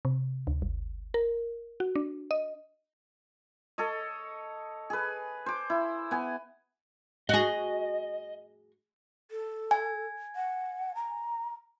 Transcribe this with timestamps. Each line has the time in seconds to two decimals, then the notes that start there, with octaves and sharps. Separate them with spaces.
0.05 C3
0.47 D2
0.62 G1
1.14 A#4
1.80 F#4
1.96 D4
2.31 D#5
3.78 A4 C#5 D#5
4.90 G#4 B4
5.46 C5 D6
5.70 E4
6.11 B3 G#5
7.29 F#4 G#4 D#5
9.31 A4
9.71 G#5
10.36 F#5
10.95 A#5